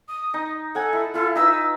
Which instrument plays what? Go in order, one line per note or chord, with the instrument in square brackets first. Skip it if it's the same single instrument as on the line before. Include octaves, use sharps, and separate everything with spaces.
[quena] D#6
[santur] D#4
[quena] A4 [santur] F#5 G#5
[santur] E4
[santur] E4 F4 [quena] A4
[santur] D#4 B4 [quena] E6